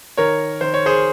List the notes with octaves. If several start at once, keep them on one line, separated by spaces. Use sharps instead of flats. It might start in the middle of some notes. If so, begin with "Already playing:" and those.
D#3 A#4 C#5
D#3 C5
C#5
G#4 C5